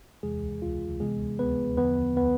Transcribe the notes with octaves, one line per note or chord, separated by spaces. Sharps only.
E2 C3 E3 G#3 G#4
F4
C3 E3 G#3 B3 G#4
B3 B4
E2 D3 F3 B3 B4
B3 B4